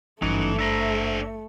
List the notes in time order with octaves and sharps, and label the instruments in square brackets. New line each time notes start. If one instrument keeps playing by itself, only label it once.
[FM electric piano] G#1 G2 C#7 [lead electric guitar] E3 [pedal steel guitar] F#3 C#4 D#4 [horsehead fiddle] A3
[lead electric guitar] D4 C5 [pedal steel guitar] E5 A#5